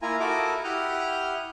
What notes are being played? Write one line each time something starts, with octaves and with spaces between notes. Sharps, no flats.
A#3 E4 F4 G#5 A#5
E4 F#4 A4 A#4 D#5 D6
E4 G4 F#5 D#6 F6 G6